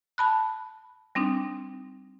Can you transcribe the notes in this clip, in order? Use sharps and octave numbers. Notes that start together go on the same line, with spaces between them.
A5 B5 F#6
G3 C4 D4 D#4